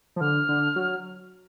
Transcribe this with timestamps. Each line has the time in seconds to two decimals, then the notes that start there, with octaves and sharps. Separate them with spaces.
0.16 F3
0.21 D3 F6
0.49 D3
0.76 F#3